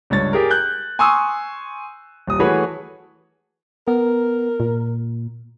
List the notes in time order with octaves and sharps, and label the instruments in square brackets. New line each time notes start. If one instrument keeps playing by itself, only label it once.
[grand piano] C#2 G2 C#5 A6
G4 G#4 A#4
F#6 G6
G#5 C6 C#6 D#6 E6
D#1 D#6
E3 A3 F#4 G#4 B4 C#5
[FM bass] B3 [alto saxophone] A#4
[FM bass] A#2